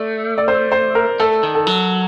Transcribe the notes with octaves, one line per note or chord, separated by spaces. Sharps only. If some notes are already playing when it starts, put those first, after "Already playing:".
Already playing: A3 D5
D5
C5
C5
A#4
A3 A4
D#3
A4
F#3